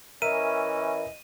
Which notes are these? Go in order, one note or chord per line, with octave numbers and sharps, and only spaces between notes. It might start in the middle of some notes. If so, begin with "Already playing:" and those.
E3 C#4 A#4 D#5 E5 D#7